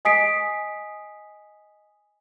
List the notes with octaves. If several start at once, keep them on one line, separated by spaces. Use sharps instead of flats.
D#5 G#5 D#6 B6 C7 D7